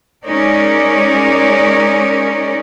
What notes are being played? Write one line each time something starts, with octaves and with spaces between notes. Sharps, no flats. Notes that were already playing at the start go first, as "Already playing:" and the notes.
G#3 C#4 D#4 A#4 D5